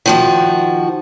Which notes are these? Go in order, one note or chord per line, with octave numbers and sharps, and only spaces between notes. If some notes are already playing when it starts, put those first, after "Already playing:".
D#3 F3 F#4